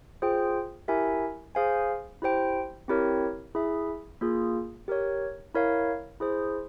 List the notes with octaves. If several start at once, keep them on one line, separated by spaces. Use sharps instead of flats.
F4 G#4 C5 G5
E4 G4 A#4 E5 G#5
G#4 C5 F5 G#5
E4 G4 C5 G5
C4 E4 G4 A#4 C#5
E4 G#4 E5
A#3 F4 G#4
G4 A#4 C#5
E4 A#4 C#5 F5
E4 G#4 C5